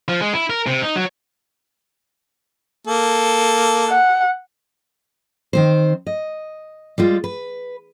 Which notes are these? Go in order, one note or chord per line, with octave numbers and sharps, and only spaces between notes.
F3
G#3
E4
A#4
C3
D#4
F#3
A#3 A4
F#5
D#3 C4 C5
D#5
G3 G#3 F4
B4